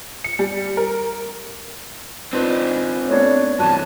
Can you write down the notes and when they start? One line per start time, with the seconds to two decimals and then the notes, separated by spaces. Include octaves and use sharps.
0.24 C#7
0.39 G3
0.77 A#4
2.33 C4 D4 D#4 F4 B4
3.08 A3 B3 D4 C#5
3.59 G2 E3 F#4 A5 F#6 D#7